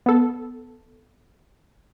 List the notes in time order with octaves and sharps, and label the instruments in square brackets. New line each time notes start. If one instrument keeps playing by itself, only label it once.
[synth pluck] B3 A4